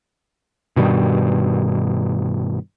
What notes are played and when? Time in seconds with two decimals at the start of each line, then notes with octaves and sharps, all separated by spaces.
0.76 G2 B2 D#3 G3